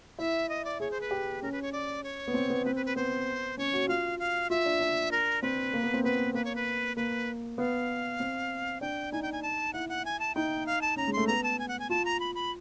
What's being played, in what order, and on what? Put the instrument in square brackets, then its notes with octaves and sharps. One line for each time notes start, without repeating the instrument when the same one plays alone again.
[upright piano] E4 [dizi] E5
[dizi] D#5
D5
[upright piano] G#4 [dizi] C#5
[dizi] C5
B4
[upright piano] G4
[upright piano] C#4 [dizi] A#4
[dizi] B4
C#5
D5
C#5
[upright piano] B3
C4
B3
[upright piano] C4 [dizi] B4
[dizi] B4
B4
[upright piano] B3 [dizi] C5
[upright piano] C#4 [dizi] C#5
[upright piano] F#4
[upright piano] F4 [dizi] F5
[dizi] F5
[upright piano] F4 [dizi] E5
[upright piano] D4
D4
[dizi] A#4
[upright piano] C4 [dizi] B4
[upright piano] A#3
B3
C4
[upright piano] B3 [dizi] B4
[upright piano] A#3 [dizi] B4
[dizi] C#5
B4
[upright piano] A#3 [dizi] B4
[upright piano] B3 [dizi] F5
[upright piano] C4
[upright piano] D4 [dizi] G5
[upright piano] D#4 [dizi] G#5
[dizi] G5
G#5
A5
[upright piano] E4 [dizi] F#5
[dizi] F#5
G#5
A5
[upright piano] D#4 [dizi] G5
[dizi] F5
A5
[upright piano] C#4 [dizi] A#5
[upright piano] G#3
[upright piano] A3 [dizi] C6
[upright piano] B3 [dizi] A#5
[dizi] A5
G#5
F#5
G#5
[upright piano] F4 [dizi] A5
[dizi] A#5
B5
B5